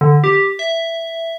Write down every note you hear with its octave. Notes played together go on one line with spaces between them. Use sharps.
D3
G4
E5